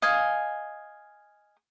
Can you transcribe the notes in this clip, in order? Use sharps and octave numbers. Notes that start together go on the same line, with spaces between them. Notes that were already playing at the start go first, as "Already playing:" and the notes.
D#5 F5 G#5